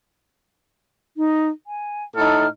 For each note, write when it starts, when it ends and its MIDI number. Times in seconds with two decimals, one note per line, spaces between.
1.17 1.49 63
1.67 2.04 80
2.16 2.46 45
2.16 2.46 63
2.16 2.46 69
2.16 2.48 89